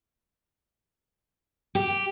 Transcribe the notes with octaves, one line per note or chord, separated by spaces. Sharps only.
G4